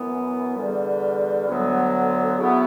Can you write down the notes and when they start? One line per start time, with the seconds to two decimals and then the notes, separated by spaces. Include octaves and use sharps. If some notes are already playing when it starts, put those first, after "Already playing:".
Already playing: F#2 E3 B3
0.56 E2 D3 G3
1.47 D2 D3 F#3 B3
2.37 C#3 F#3 B3 E4